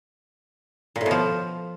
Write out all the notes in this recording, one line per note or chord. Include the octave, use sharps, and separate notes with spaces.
A#2
A2
B2
F3